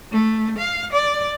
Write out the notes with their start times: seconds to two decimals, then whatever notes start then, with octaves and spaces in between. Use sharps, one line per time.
0.11 A3
0.58 F5
0.93 D5